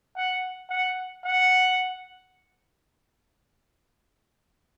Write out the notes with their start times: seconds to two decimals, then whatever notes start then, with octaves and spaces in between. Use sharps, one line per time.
0.16 F#5
0.70 F#5
1.25 F#5